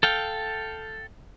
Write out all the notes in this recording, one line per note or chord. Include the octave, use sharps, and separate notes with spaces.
A4 F5 G5